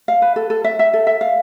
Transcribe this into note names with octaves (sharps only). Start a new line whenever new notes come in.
F5
B4
A4
A4
E5
E5
A4
E5
F5